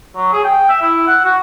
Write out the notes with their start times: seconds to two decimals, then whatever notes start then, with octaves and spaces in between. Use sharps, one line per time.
0.15 F#3
0.33 G#4
0.44 G5
0.69 E5
0.82 E4
1.07 F#5
1.25 F#4